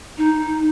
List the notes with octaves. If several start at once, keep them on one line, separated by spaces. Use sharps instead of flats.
D#4